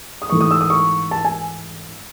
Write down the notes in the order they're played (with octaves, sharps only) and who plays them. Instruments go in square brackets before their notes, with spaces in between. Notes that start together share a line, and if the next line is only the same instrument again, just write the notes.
[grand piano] D#6
G#2 E3 A3 C#6
D#6
E6
D#6
C#6
A5
G#5